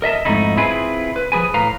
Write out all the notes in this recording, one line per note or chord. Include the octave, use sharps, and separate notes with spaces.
A#4 D#5 E5 A5
F2 G#2 A3 D#4 E4
C4 E4 F4 G#4 B4
B4
F3 G#4 B4 G#5
A2 B4 F5 A#5